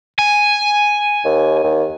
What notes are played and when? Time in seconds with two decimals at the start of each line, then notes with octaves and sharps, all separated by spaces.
0.19 G#5
1.25 D#2
1.64 D#2